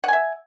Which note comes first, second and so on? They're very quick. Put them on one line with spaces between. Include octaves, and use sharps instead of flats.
F#5 G#5 E5